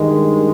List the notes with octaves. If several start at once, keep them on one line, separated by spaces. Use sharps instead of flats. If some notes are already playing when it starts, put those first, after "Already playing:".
Already playing: G2 D#3 G#3